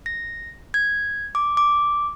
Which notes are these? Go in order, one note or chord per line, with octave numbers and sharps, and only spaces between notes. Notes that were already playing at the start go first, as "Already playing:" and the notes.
A#6
G#6
D6
D6